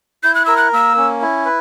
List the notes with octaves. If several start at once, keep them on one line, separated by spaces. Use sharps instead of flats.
E4 G6
F#6
A#4 E6
F#6
A#3 E6
C#4
E4
B4